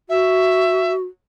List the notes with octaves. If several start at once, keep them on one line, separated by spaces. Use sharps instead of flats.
F#4 E5